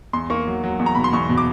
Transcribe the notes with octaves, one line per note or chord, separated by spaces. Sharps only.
E2 C6
A#3 C#6
F#3
F#3
E2
A#5
B2 B5
C6
E2 C#6
B2
D6